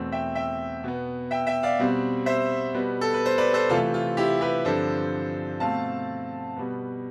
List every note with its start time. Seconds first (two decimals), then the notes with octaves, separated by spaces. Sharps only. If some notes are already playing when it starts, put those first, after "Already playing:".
Already playing: E2 B2 A3 C4
0.12 E5 G5
0.35 E5 G5
0.84 B2 B3
1.31 E5 G5
1.47 E5 G5
1.63 D5 F5
1.79 B2 G3 C4
2.26 C5 E5
2.74 B2 G3 B3
3.01 A4
3.14 B4
3.26 C5
3.38 B4 D5
3.54 A4 C5
3.69 C3 E3 A3 C4 F4 A4
3.94 F4
4.17 E4 G4
4.41 G4 B4
4.65 G2 D3 F3 C4 A4 C5
5.60 B2 A3 C4 F5 A5
6.57 B2 G3 B3